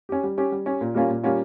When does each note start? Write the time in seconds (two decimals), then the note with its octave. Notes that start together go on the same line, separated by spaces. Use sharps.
0.09 C#4 G4
0.23 G3
0.38 C#4 G4
0.52 G3
0.66 C#4 G4
0.81 A#2
0.95 G3 A#3 C#4 F4
1.09 A#2
1.23 G3 A#3 C#4 F4